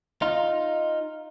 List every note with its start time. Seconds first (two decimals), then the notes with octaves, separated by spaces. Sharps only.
0.22 D#4 F4